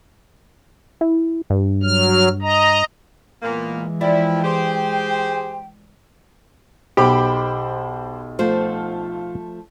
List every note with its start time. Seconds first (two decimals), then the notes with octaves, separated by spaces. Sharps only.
1.01 E4
1.50 G2
1.83 F#3 F6
2.42 D#5 A#5
3.42 A#2 E3 G#3 A#3 B3
4.01 F3 E4 D5 G5
4.43 G4 G#4 C5
6.97 B1 G4 C5 B5 D6
8.39 F3 A3 F4 C5